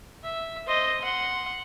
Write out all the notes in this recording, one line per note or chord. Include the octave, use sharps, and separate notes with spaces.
E5
C5 D#5
F#5 C6